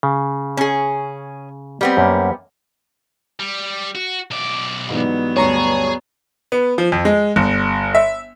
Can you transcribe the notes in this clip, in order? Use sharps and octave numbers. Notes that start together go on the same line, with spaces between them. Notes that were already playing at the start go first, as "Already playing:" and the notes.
C#3
C#4 G#4
G3 B3 C4
F#2 A#3
G3
F#4
B1 D5
G#2 E3 F#3 G3 B3
D2 G2 G#4 C#5 A#5 C#6
B3
F3
F2
G#3
G1
E5